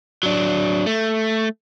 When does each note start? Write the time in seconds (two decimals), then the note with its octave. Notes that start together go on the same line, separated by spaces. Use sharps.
0.23 F#3 D4
0.86 A3